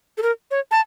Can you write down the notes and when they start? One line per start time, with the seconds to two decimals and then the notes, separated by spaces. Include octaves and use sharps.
0.18 A4
0.22 A#4
0.51 C#5
0.71 A5